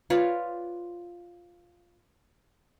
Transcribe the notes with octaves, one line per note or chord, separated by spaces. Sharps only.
F4 B4 C#5 D5